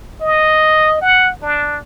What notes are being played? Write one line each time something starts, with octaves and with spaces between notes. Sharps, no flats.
D#5
F#5
D4